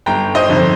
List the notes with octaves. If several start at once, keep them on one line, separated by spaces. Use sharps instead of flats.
G1 G5 A#5
C5 D#5
F2 D3
C5